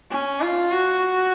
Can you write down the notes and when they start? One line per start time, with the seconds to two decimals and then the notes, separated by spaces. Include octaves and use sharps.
0.11 C#4
0.41 F4
0.72 F#4